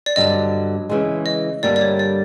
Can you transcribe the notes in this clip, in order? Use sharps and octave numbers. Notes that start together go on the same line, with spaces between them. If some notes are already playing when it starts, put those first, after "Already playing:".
D5
G2 D3 F#3 D#5
C#3 E3 G#3
D#5
G2 D3 G3 A#3 D5
D5
C#5
D5